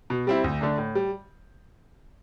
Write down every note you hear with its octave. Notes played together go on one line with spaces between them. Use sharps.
B2
G3 C4 E4
D2
D3 A3 D4
A2
G3